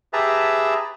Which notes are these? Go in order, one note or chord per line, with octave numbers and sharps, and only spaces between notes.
G4 G#4 B4 E5 A5 A#5